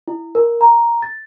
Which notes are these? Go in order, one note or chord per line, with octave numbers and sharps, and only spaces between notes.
E4
A#4
A#5
A6